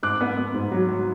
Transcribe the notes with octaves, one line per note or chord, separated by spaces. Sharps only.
G#2 D6 F#6
B3
B3
G#2
F#3
F#3